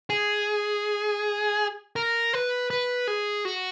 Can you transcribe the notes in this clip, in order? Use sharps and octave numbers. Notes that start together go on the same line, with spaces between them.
G#4
A#4
B4
B4
G#4
F#4